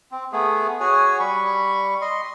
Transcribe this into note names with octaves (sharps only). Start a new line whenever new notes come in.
C4
A3 B3 G#4
F#4 G#4 C#5 G#5
G3 B5 C#6
D#5 C6